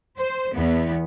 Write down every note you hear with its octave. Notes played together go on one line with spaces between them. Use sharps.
C5
E2 B3